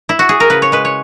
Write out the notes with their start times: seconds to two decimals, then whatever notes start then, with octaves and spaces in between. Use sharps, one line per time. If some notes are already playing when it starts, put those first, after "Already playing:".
0.09 E4
0.19 F#4
0.29 G#4
0.40 A#4
0.50 C#3 B4
0.62 C#5
0.72 G#3 B4
0.85 C#5